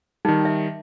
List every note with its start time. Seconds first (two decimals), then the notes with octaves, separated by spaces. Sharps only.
0.25 D#3 G3 D#4
0.45 E5